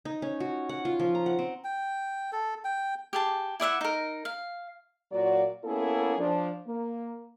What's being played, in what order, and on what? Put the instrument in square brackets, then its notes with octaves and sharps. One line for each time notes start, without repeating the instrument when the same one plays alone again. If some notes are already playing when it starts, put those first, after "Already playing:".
[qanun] D#4
C#4
F#4
F#5
F4
F3
A#5
F#5
C4
[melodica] G5
A4
G5
[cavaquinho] G4 G#4 A5
E4 D5 E5 F#5
D#4 A#4
F5
[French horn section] A#2 F#3 F4 F#4 D5
A#3 B3 C#4 E4 G#4 A4
F3 D4
A#3